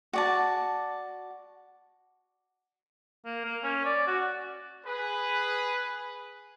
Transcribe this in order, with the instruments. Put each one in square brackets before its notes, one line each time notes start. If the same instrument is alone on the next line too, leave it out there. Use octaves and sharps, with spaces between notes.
[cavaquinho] F#4 D5 A5
[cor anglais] A#3
A#3
C#4
D5
F#4
[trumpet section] G#4 B4